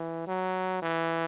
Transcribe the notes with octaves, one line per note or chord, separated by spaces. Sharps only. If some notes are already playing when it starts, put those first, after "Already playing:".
Already playing: E3
F#3
E3